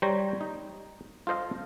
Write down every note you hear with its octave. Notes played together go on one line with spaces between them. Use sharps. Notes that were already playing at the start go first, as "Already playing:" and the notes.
G3 C5 C#5 A#5
D#4
F4 A4 C5 D#5 F5